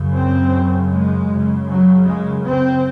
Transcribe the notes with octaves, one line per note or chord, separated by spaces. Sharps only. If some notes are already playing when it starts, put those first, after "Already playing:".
Already playing: F#2 C#3
C4
G#3
F#2 C#3
F#3
G#3
C4